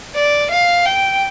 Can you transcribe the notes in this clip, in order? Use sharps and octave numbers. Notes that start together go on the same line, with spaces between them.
D5
F5
G5